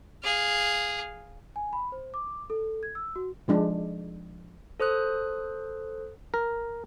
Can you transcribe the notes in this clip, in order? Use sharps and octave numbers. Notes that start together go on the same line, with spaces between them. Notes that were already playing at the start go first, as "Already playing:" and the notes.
G#4 F5
G#5
B5
C5
D6
A4
G#6
E6
F#4
F3 G#3 D4
A4 C5 D#6 F#6
A#4